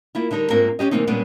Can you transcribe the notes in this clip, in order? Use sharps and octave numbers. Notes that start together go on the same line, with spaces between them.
A#3 E4 F4
D3 G3 D#4 A#4
G#2 A#3 C4 D4 F4 A#4
C#4 D4 G4 D#5
C3 E3 G#3 A#3 C4 D#4
A#2 G3 G#3 A#3 B3 C#4